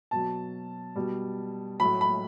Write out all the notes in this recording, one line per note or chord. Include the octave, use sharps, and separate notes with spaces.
B2 F#3 A5
B2 G3
A2 F#3 B5
B5